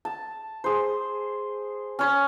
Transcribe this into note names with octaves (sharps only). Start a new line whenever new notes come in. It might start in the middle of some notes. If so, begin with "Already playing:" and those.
A5
G#4 C5
C#4 C#5